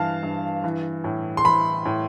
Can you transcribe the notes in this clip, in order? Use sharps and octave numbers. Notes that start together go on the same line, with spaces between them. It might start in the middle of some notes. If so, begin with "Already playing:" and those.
Already playing: G2 E3 F5 A5
G2
E3
A2
C6
E3 B5
A2